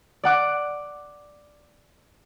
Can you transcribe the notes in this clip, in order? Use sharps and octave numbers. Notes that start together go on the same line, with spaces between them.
D5 F#5 D6 F#6